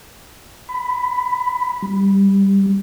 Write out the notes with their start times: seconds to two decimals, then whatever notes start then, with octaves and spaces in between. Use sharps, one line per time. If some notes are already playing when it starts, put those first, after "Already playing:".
0.69 B5
1.82 G3